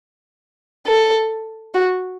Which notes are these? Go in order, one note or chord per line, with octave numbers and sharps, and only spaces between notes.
A4
F#4